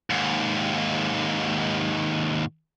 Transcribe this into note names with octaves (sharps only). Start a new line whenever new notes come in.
D#2 G#2